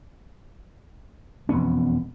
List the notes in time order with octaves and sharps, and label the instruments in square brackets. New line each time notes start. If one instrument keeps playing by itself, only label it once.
[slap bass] E1 F2 B3 C#4